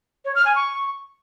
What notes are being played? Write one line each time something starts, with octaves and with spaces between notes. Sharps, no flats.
C#5
F6
G#5
C#6